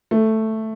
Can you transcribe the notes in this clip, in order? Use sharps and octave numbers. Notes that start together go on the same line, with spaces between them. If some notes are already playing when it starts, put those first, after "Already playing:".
A3